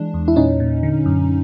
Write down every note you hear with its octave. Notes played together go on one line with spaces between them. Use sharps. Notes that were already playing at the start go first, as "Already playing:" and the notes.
Already playing: E3 G#3 D4
E2
E4
A#2 C#4 D#4
A#2
D3
F#2